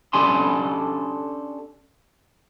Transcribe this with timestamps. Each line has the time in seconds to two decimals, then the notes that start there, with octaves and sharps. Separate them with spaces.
0.13 C#4 D4 G4 A4 G#5 C6